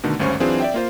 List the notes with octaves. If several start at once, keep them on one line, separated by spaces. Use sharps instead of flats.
B2 D3 D#3 A3
G#1 D2 G2 C#4 C5 C#6
E3 F#3 C4 D4 F4 G#4
D5 E5 G5
A#3 F4 C5